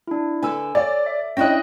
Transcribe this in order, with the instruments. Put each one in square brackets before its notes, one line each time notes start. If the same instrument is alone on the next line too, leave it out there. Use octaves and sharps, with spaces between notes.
[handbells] D4 E4
[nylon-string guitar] D3 B4 [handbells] G#5 E6
[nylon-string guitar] C#5 [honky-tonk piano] D5
[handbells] E5
[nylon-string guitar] C#4 D4 E4 [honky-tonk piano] D#5 G5 [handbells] F#6 A#6